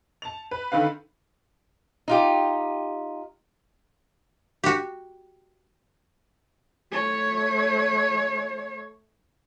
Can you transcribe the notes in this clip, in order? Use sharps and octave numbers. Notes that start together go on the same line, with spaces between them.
A5 F7
B4
D3 D#3 B4 F5
D#4 F4 G4
F#4 G4
A3 C#5